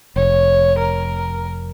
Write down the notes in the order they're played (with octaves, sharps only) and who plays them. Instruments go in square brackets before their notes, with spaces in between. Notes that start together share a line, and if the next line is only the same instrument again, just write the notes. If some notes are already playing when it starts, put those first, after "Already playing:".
[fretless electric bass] F1 [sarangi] C#5
[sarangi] A#4